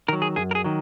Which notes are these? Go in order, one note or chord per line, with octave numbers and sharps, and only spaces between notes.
D#3 F#3 A#4
G#4
F#2 G#4
A#4
G#4
D#3 F#3